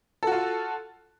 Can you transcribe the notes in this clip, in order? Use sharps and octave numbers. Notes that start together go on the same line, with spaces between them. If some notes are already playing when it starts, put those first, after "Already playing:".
F4 F#4 A4